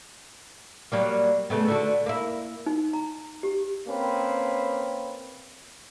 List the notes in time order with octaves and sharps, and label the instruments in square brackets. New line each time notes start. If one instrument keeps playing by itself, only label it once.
[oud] F#3 G3 A#3
C#3 A3 B3
D3 A3 F#4
A#3 E4
[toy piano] D#4
A#5
G4
[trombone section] A#3 C4 C#4 B4